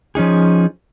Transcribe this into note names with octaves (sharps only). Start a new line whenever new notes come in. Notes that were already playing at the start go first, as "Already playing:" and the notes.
F3 C#4 D#4 G#4